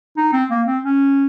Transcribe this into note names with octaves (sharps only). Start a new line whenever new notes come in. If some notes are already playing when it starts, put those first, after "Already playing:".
D#4
C4
A#3
C4
C#4